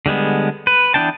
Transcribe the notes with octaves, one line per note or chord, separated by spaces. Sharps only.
D3 G3 G#3 B3
B4
E3 B3 D4 G5 A5